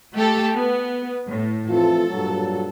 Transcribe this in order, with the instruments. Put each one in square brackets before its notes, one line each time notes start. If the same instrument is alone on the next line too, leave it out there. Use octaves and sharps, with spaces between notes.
[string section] A3 G4 A4
B3
A2
[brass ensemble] F2 E3 F4 [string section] A4
[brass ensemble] G2 A#2 F#3